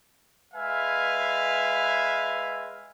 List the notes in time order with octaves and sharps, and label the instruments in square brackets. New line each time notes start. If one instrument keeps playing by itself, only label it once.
[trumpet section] G#3 B4 E5 F5 G#5